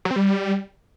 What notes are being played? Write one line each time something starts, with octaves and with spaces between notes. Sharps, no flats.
F#3
C4
G3